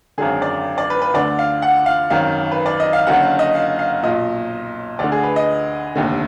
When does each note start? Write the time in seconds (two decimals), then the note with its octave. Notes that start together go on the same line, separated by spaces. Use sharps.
0.18 G#1 F#2 D3 G#4
0.42 D5
0.78 D5
0.90 B4
1.02 B4
1.14 D2 D3 D5
1.39 F5
1.62 F#5
1.86 F5
2.10 G#1 F#2 D#3 F5
2.52 B4
2.66 D5
2.80 D#5
2.93 F5
3.07 F#1 F#2 D3 F#5
3.23 F5
3.39 D#5
3.55 F5
3.79 F5
4.03 B1 A#2 D#5
4.99 D2 D3 D5
5.12 G#4
5.24 B4
5.36 D#5
5.96 F1 D#2 D3